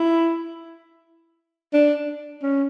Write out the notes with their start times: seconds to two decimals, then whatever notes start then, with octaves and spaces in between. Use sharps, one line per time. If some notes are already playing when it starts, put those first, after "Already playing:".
Already playing: E4
1.74 D4
2.43 C#4